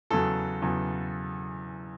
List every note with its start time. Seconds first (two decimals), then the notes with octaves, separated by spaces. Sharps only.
0.10 E2 C#3 F#3 A4
0.62 E2 C#3 F#3